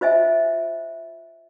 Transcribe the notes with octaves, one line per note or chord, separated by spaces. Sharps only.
F4 C5 D#5 E5 G#5